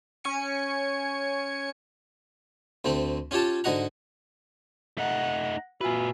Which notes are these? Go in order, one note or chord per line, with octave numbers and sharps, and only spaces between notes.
C#4 G#5 C#7
D2 A3 C4
C#4 F4 G4 C#5 A5
G#2 D3 F#4 D#5 F#5 A#5
A3 D#4 F#5
A#2 F4 F#4 B4 E5 G#5